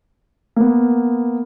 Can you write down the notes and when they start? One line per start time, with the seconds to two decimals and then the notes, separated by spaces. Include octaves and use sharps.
0.56 A#3 B3